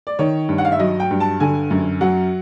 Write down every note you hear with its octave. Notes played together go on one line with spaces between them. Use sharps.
D5
D#3 C#5
G2
F#5
F5
E5
F#3 D#5
G5
G2
A5
D3 G#5
F#2
F#3 F#5